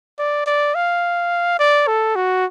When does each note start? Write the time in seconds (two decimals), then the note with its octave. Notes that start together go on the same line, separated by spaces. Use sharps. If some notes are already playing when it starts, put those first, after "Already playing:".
0.18 D5
0.46 D5
0.75 F5
1.59 D5
1.87 A4
2.16 F#4